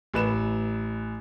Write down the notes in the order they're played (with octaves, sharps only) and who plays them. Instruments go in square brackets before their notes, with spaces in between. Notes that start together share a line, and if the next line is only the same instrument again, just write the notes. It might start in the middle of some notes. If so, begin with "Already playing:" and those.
[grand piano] A1 B4 E7